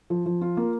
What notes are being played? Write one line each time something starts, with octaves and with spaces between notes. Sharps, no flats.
F3
F3
F4
A#3